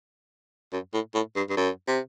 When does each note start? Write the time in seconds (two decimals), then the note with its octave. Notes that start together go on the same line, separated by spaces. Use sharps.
0.73 F#2
0.94 A2
1.15 A2
1.36 G2
1.49 G2
1.57 F#2
1.87 C3